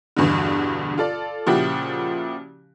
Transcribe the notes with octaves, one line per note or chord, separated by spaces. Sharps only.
E2 G2 B2 D3
F4 A4 D5
A#2 C#3 F3 E4 F#4 G4